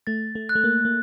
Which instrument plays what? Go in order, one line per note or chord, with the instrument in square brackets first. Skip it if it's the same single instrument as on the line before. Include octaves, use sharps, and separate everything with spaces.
[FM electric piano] A3 [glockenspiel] A6
[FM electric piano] A3
[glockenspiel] F#6
[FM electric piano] A3
A#3
A#3